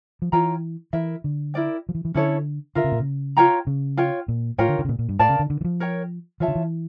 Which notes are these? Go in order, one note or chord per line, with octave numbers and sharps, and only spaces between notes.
F3
E3 F4 C#5 G5 A#5
E3 E4 A#4 E5
D3
E4 A#4 D5 G5
F3
E3
E3
D3 C#4 E4 A4 C#5
D3 F4 A#4 E5
C#3
A#2
C#3
F4 C#5 G5 A#5
C#3
F4 C#5 G5
A#2
A2 F4 A#4 C#5 G5
D3
D3
C#3
A#2
A#2
G2
A2 A#4 D5 F5 A5
C#3
D3
D3
E3
F3
A#4 C#5 G5
E3 F4 C#5 E5 A5
D3
E3